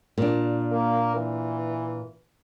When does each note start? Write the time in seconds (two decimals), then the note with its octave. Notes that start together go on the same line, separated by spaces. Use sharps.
0.18 A#2 D4
0.72 A#3
1.16 E3